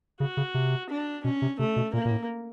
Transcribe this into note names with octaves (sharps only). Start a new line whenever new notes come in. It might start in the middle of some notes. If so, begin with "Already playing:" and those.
C#3 F#4
C#3
C3
D4
B2 C#4
C3
C3 A3
B2
A#2 A#3
A#2
A2